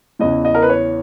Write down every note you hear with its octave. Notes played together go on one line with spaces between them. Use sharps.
E2 C#3 E3 D#5
D#5
A#4
B4
C#5